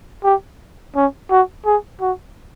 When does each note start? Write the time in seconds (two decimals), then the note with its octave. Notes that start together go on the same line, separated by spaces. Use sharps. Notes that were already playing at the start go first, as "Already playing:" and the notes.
0.24 G4
0.95 C#4
1.31 F#4
1.66 G#4
2.01 F#4